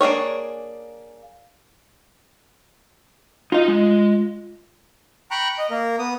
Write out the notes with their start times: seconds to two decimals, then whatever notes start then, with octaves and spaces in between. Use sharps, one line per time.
0.01 A#3 D4 G#4 C#5
3.52 D#4 F4 D#5 F5
3.68 G#3
5.31 G5 A#5 B5 C#6 F#6
5.58 D#5
5.71 A#3 A#4
5.99 B3 D#6